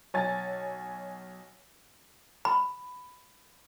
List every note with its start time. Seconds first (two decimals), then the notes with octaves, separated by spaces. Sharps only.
0.14 B1 C#5 G#5 A6
2.45 B5